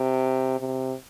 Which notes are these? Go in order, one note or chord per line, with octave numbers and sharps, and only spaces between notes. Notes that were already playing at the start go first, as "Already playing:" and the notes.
Already playing: C3
C3